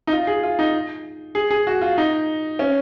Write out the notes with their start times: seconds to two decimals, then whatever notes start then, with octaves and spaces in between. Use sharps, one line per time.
0.07 D#4
0.13 F4
0.27 G#4
0.43 F4
0.59 D#4
1.35 G#4
1.51 G#4
1.67 F#4
1.82 F4
1.98 D#4
2.59 C#4